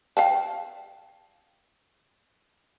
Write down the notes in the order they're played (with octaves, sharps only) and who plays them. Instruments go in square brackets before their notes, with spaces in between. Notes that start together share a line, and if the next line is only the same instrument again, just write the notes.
[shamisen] F5 G5 A5